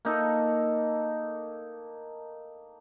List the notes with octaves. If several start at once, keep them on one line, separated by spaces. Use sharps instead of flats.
A#3 D#4 A4